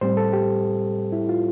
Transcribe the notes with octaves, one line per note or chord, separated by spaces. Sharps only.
A2 G3 C4 C5
A4
G4
E4
F4